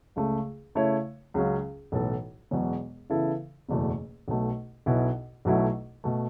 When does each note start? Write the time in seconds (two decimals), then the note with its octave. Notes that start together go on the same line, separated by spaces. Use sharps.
0.16 C#2 C#3 A3
0.75 C#3 A3 E4 C#5
1.34 C#2 C#3 F#3 C#4
1.92 B1 A2 E3 B3 A4
2.51 E1 E2 B2 F#3
3.10 C#3 E3 B3 E4 A4
3.69 F#1 E2 B2 A3
4.28 B1 B2 A3
4.86 B1 B2 B3 E4
5.45 B1 B2 F#3 A3 E4
6.04 B2 A3